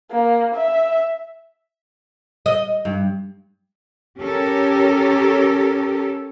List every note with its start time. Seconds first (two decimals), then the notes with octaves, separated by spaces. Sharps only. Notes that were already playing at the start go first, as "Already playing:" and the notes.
0.11 A#3
0.54 E5
2.46 D#5
2.85 G2
4.21 C#4 G4 A4 A#4